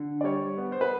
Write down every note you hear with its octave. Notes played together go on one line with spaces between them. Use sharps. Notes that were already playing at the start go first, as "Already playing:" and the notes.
Already playing: D3
D5
G3 C#5
B3
C5
B4